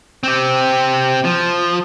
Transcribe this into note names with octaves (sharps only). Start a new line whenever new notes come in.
C4 G4
F3